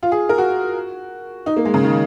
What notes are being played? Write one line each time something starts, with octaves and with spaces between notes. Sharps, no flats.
F4
G#4
A#4
F#4
D#4
A#3
G#3
C#3
D#3